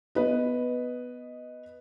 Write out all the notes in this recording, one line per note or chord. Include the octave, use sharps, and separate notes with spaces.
B3 B4 D#5